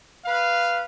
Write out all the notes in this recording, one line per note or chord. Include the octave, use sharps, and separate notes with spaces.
B4 F5